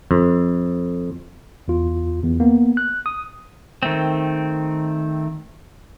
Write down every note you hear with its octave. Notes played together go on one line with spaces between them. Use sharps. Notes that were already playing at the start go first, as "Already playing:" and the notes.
F2
E2 F4
E2
A#3 B3
F#6
D#6
D#3 A3 C4